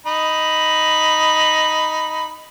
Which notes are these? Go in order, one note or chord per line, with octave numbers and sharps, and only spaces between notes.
D#4 B5